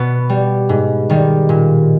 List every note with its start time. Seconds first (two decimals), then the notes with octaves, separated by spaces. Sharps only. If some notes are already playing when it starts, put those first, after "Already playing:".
Already playing: B2 B3
0.29 G3
0.69 G#2
1.10 D#3 G3
1.49 A#2